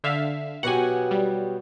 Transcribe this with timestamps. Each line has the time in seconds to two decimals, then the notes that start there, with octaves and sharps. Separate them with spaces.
0.04 D3 E5 F5
0.63 B2 F#3 G4 F#5 G#5
1.11 G3